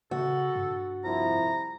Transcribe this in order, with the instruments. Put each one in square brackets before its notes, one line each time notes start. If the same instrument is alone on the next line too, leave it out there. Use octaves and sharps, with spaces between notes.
[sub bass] C#3 [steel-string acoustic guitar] F#4 [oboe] A4
[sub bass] G2
[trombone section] C2 F3 E4 [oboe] A#5